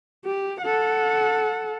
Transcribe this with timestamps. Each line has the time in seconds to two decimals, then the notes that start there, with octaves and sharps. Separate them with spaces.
0.25 G4
0.62 A4 F#5